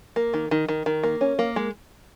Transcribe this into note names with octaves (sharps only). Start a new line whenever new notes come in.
A#3
D#3
D#3
D#3
D#3
A#3
C#4
A#3
G#3